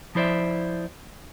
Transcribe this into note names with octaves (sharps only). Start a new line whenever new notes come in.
F3 E4 C5 D5 E5